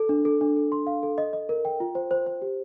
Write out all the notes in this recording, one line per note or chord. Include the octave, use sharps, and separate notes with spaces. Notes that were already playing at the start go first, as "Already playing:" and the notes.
Already playing: A4
D4
A4
D4
A4
C6
F5
A4
D#5
D#5
A#4
G5
F4
C5
C5
C5
G4